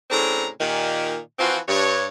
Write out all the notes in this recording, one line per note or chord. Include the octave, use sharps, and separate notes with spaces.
A2 C#3 C4 D4 A4 A#5
A#2 D#3 G4
E3 F3 C4 F4 F#4
G2 C#5